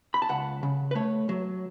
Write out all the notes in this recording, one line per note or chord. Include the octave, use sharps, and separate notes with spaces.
B5
A5
C#2 F#5
C#3
B4
A3 C#5
F#3